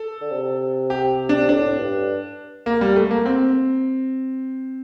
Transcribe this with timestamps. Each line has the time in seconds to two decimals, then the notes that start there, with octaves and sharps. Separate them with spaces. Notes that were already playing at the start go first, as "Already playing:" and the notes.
Already playing: A4
0.21 D3
0.31 C3
0.90 G4
1.29 D4
1.49 A2 D4
1.78 G2
2.66 A#3
2.81 G3
2.96 A3
3.11 A#3
3.25 C4